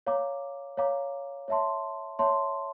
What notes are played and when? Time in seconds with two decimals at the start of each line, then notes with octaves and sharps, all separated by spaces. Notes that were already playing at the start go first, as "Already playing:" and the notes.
0.07 C#5 F5 A#5 D6
0.77 C#5 F5 A#5 D6
1.48 C#5 E5 A5 C6
2.19 C#5 E5 A5 C6